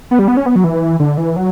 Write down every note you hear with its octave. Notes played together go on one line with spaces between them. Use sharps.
B3
G3
B3
C#4
B3
F#3
E3
D3
E3
F#3